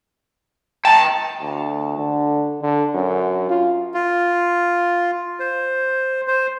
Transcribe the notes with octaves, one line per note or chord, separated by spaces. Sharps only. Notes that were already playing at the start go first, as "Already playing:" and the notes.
G5 A5 A#5
D2
D3
D3
F#2
F4
F4
C5
C5